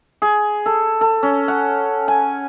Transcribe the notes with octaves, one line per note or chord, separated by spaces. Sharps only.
G#4
A4
A4
C#4
F#5
G#5